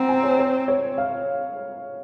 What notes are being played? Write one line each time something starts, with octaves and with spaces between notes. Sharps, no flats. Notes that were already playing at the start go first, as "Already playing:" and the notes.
Already playing: C4 F#5 A#5
G#5
C#5
C#5
C#5
F5